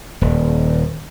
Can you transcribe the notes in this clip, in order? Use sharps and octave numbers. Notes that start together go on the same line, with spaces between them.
D#1